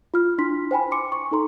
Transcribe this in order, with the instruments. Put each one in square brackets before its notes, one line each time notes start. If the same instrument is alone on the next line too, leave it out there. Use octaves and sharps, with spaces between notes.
[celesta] F4 F6
D4 E4 C6 B6
C5 G5 G#5 B5
C6 D6 C#7
C#6
D#4 A4 A#5 C6